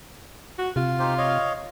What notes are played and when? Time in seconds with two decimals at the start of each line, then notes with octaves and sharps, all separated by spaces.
0.58 F#4
0.76 C3 F4
0.99 D#4 G4 C5
1.18 C#5 D#5 F5